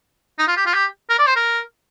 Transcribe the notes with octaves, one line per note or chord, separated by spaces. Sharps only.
D#4
F4
G4
F4
G4
A#4
D5
C5
A#4